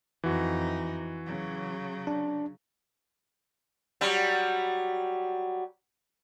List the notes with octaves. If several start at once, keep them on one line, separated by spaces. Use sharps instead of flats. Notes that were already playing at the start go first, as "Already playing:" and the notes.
F2 E3 D#4 F#4
C#3 F#3
D4
F#3 G3